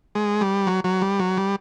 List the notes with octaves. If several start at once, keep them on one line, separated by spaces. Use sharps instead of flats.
G#3
G3
F#3
F#3
G3
F#3
G3